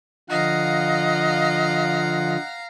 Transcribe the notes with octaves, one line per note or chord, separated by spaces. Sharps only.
D3 F3 F4 D#5 F5 F#5 A#5